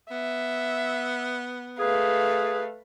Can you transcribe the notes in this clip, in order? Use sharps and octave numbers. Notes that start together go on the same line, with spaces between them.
B3 E5
A3 G#4 B4 F5